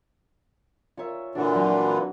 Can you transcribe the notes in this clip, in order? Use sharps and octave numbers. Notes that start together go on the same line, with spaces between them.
C#4 F4 A#4 C#5 E5
A#2 D3 E3 D4 F#4 F5 A5
F#3 C4 F#4 F#5 A#5